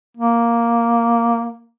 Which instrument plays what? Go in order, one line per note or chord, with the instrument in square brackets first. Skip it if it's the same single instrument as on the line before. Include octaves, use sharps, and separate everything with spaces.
[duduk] A#3